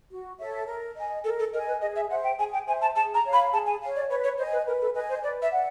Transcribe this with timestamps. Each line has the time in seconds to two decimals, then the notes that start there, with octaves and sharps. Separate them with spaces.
0.10 F#4
0.39 A4 C#5 E5
0.67 A#4
0.96 D#5 G#5
1.24 A4 A#4
1.39 A4
1.53 A#4 D#5
1.57 G#5
1.67 B4
1.81 G#4 D#5
1.96 E5
2.10 C5 E5 F#5
2.24 G5
2.38 G#4 G#5
2.53 G5
2.67 C5 E5 G#5
2.82 A5
2.96 G#4 A5
3.14 A#5
3.25 C#5 F5
3.33 B5
3.52 G#4 A5
3.66 G#5
3.81 C#5 F5
3.96 D5
4.10 B4 C#5
4.24 C#5
4.38 C5 D#5 G#5
4.53 B4
4.66 A#4 B4
4.82 A4
4.95 B4 D#5 G#5
5.09 C5
5.23 B4 D5
5.42 E5
5.52 D5 F#5